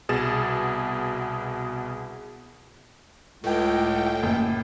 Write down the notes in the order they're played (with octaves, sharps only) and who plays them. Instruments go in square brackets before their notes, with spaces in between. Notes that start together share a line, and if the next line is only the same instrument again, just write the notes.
[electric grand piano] C2 B2 G#4 A6 E7
[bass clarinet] C#2 [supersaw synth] A2 G5
[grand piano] F#1